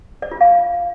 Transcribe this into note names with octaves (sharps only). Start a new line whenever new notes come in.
D5
F4
F5